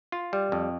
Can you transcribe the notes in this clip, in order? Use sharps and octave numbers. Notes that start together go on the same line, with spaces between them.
F4
G3
F2